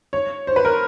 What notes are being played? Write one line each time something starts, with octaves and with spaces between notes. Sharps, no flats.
C#5
C5
B4
A#4